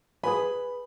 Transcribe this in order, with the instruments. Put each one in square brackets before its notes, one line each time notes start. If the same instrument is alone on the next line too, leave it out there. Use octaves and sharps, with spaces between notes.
[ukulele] G#4 B4 G#5 [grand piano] B5